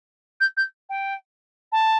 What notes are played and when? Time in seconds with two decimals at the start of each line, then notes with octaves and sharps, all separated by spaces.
0.40 G6
0.57 G6
0.89 G5
1.72 A5